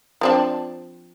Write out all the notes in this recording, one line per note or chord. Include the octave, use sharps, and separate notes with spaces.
F3 C4 D4